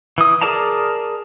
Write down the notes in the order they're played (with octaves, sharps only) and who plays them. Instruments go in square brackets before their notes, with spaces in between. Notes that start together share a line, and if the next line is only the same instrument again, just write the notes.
[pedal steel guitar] E3 D#6
G#4 A#4 D5 A5 A#5